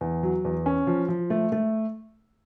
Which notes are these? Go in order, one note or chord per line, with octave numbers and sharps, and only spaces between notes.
E2
F#3
E2
C#4
F3
F3
A3
A3